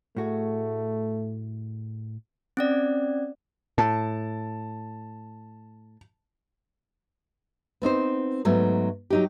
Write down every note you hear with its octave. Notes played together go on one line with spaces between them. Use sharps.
A2 A3 F#4 G#4
C4 C#4 D5
A2 A5
B3 C4 D#4 C5
G#2 F#3 A3 B3
F#3 D#4 G4